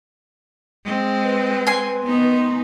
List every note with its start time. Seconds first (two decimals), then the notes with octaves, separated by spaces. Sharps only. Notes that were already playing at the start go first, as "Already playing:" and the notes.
0.84 G#3 C4
1.24 B4
1.67 G#5 C6
2.06 D#3 B3 D#4